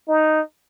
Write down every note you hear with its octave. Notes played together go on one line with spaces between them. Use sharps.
D#4